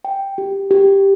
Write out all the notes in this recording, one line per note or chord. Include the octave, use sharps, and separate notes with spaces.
G5
G4
G4